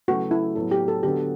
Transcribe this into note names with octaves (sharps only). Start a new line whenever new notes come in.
C#3 F#3 A3 E4 F#4 B4
E4
A2 F#3 B3 A4
G4
A4
D3 F#3 B3 F#4 G4 A4